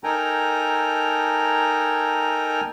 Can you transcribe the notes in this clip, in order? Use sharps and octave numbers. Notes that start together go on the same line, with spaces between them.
D#4 A4 A#4 G5 G#5 A#5